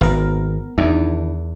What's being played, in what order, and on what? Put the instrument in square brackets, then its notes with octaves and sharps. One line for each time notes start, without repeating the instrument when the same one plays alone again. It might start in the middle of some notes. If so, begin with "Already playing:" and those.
[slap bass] G#1 [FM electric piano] B3 A#4
[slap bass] E2 [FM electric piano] D#3 D4 E4